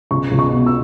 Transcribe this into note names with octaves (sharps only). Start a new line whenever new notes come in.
C#2 C#6
C#2
C#6
B2
E6